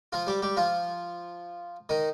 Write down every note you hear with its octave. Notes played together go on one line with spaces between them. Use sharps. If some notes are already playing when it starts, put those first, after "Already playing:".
F3 F4
G3 G4
G3 G4
F3 F4
D#3 D#4